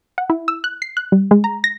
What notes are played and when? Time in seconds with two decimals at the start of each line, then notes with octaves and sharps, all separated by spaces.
0.18 F#5
0.30 E4
0.48 E6
0.64 F#6
0.82 C7
0.97 F#6
1.12 G3
1.31 G#3
1.44 A#5
1.64 A#6